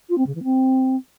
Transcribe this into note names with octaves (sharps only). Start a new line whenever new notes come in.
F4
C4
C#3
E3
C4